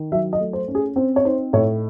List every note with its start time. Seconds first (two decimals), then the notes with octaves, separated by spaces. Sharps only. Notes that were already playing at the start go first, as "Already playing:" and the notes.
Already playing: D#3
0.12 F#3 E5
0.33 D#5
0.40 A3
0.53 C5
0.68 C#4
0.75 G#4
0.96 C4 C5
1.16 C#5
1.24 D#4 C5
1.53 A2 C#5